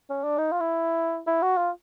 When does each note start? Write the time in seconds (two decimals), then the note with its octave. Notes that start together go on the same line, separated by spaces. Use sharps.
0.09 C#4
0.23 D4
0.38 D#4
0.52 F4
0.60 E4
1.27 E4
1.42 F#4
1.57 F4